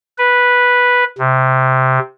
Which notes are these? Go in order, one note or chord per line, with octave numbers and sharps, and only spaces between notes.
B4
C3